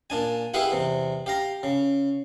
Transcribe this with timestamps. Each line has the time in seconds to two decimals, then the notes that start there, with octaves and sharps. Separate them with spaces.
0.10 A#2 D4 G#5
0.54 E4 G4 G#4 B4 F5 F#5
0.72 E2 C3
1.26 G4 F5 A#5
1.63 C#3